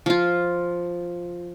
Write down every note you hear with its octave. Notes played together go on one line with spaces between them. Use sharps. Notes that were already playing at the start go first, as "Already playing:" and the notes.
F3 F4